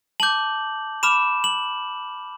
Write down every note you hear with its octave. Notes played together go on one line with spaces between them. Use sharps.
A5 D6 G6 F#7
B5 D6 F6 E7
F#7